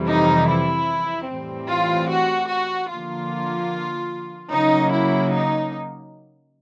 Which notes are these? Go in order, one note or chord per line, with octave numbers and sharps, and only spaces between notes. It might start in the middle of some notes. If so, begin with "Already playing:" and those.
Already playing: F2 C3 E3 G3
D#4
E4
A2 E3 G3 C4
F4
F#4
F#4
D3 F3 A#3 F4
C#3 F#3 A#3 D#4
E4
D#4